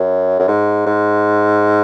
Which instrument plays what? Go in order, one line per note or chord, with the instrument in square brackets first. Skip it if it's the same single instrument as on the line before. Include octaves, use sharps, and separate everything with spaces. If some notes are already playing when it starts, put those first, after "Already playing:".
Already playing: [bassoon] F#2
F#2
G#2
G#2